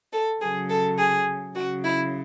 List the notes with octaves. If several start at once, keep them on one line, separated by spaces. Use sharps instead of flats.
A4
C#3 F#3 G#4
A4
G#4
C#3 F#3 F#4
E4